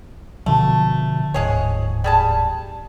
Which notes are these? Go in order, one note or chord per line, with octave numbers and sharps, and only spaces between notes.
B2 D3 F3 A3
D1 G#2 G#3 G#4 C#5
G3 G#4 A5